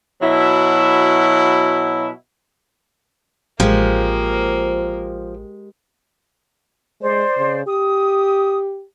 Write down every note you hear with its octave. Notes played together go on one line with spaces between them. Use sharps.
B2 F#3 E4
A1 F3 G#3 A#3 G4
G#3 C5 D5
C#3
G4 D#6